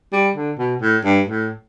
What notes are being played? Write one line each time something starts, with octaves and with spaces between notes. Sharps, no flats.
G3
D3
B2
A2
G2
A2